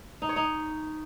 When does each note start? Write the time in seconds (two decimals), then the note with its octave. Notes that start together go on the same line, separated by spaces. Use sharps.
0.22 D#4
0.29 C#5
0.36 D#4